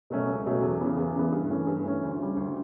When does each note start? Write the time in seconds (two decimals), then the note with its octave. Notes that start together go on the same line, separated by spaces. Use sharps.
0.10 B2 F#3 A3 C#4
0.28 C#2
0.46 B2 F#3 A3 C#4
0.62 E2
0.81 C#3 E3 B3
0.97 E2
1.16 C#3 E3 B3
1.32 G2
1.50 E3 A3 C#4
1.67 G2
1.84 E3 A3 C#4
2.03 D2
2.19 C#3 G3
2.37 D2